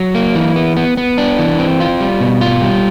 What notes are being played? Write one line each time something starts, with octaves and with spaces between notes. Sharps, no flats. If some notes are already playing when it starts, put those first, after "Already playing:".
Already playing: F#3
A#3
E3
B3
B3
B3
D4
E3
C4
F4
G3
B2
F4
G3